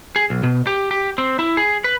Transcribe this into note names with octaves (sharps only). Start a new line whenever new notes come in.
G#4
B1
B2
G4
G4
C4
E4
G#4
B4